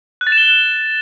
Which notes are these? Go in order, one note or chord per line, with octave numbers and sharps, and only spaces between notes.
F#6
A6
E7
G7